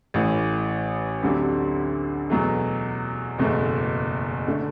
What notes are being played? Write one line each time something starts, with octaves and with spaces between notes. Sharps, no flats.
A1 A2 E3
D2 D3 F#3 C4 G4
E2 B2 F#3 A3
F#1 E2 B2 A3
D3 A3